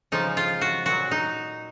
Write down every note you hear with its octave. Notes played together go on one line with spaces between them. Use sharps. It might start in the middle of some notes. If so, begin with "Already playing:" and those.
C#3 F3 G#3 D#4
F4
F#4
A#2 F#3 F#4
D#4